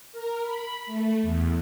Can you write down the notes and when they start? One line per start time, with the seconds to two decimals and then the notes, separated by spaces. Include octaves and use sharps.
0.12 A#4
0.42 B5
0.86 A3
1.22 E2